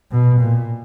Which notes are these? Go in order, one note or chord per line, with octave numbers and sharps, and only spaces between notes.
B2
A#2